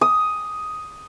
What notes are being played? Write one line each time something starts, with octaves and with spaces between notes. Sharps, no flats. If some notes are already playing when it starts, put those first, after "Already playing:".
D#6